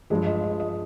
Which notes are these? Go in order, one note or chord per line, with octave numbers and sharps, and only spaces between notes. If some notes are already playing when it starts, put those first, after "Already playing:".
G2 F3 G#3 G#4
D#5
D#5
D#5